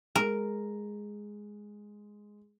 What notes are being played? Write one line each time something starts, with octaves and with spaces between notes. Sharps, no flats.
G#3 A#4